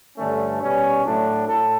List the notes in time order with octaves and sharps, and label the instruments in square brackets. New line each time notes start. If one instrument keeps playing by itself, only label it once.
[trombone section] G2 D3 A3 C#4
B2 G3 C#4
A2 F#3 A3 D4
A2 A4